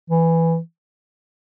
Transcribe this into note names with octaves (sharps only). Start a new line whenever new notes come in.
E3